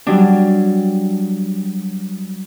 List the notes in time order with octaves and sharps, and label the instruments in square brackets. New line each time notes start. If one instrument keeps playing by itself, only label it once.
[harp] F#3 G3 D4